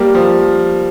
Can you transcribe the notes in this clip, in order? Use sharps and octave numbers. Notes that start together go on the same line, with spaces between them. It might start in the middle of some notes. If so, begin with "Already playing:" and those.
Already playing: G3 A#3
F3